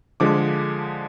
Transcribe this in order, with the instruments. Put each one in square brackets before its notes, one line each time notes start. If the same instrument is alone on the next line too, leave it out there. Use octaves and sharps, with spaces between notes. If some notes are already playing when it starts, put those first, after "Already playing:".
[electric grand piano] D3 F3 G#3 D6